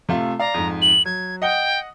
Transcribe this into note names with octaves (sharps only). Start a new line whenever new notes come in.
C3 A3 F4
D5 F5 A#5
F2 G#2
F#7
F#3 G#6
D#5 F#5 G5 G7